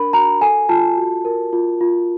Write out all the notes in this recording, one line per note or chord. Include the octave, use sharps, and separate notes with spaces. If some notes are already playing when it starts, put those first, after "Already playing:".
Already playing: D4 A#4 B5
F#4 A#5
A4 G#5
F4 A5
F#4
A#4
F4
F4